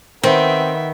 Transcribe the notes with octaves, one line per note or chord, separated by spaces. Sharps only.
D#3 B3 C4 E5